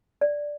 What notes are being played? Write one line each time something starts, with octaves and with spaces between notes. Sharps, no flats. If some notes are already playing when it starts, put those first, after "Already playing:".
D5